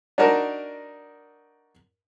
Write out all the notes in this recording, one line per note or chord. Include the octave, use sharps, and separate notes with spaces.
D4 D#4 F#4 A#4 A5